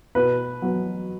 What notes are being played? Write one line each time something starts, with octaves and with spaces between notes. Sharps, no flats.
B2 B4
F#3 B3